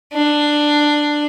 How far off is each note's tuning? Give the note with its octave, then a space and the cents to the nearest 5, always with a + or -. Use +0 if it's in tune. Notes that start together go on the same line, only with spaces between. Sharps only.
D4 +10